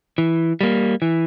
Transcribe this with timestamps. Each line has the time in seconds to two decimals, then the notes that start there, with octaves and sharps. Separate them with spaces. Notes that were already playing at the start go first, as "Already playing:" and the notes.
0.18 E3
0.61 G3 A#3
1.02 E3